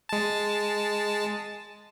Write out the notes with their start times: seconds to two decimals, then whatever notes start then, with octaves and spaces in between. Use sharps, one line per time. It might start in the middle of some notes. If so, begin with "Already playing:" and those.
0.09 G#3 A5